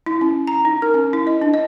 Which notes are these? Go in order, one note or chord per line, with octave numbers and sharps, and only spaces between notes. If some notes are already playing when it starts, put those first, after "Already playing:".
E4
C#4
A#5
D#4
A#4
C#4
E4
D#5
D4
D#5